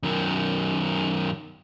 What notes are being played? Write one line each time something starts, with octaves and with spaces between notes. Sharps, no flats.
F#2 D#3